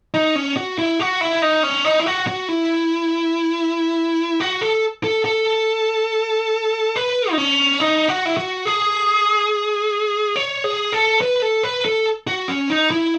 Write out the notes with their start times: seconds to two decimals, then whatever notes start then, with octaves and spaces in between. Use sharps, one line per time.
0.14 D#4
0.36 C#4
0.57 F#4
0.78 E4
1.00 F#4
1.21 E4
1.42 D#4
1.63 C#4
1.85 D#4
2.00 E4
2.06 F#4
2.27 F#4
2.49 E4
4.40 F#4
4.61 A4
5.04 A4
5.25 A4
6.96 B4
7.31 D#4
7.38 C#4
7.80 D#4
8.08 F#4
8.26 E4
8.37 F#4
8.65 G#4
10.36 C#5
10.64 G#4
10.92 A4
11.21 B4
11.42 A4
11.63 B4
11.85 A4
12.27 F#4
12.48 C#4
12.70 D#4
12.91 E4